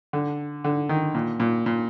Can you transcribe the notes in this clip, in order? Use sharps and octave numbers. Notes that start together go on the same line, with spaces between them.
D3
D3
D#3
A#2
A#2
A#2